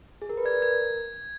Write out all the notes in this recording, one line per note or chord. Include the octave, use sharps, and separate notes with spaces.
G#4
A#4
B4
D5 G#6
A#4 G#6